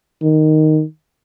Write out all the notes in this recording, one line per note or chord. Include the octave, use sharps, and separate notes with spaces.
D#3